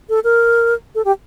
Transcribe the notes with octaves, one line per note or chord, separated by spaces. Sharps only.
A4
A#4
A4
G4